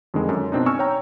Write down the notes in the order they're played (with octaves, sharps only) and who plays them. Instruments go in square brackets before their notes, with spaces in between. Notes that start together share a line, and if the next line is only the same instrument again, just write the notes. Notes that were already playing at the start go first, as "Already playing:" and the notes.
[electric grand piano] F2 D3 D#3 G#3
F#2
B2 C4 D4 D#4
G#5 C#6 E6 F6
C#5 G5 A#5